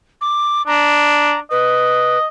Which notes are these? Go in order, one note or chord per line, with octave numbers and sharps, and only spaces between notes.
D6
D4 A#5
B4 D#5